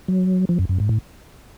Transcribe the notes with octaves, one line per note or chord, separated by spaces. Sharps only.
F#3
F3
F#2
F#2
G#2
A2